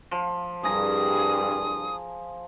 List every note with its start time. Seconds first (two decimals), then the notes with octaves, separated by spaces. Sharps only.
0.11 F3
0.64 C2 G2 G#4 A#5 D#6